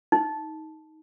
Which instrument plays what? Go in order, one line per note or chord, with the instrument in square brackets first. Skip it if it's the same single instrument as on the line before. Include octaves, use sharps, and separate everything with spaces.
[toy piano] D#4